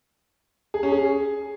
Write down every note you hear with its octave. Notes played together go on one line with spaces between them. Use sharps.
G#4
C#4
G#4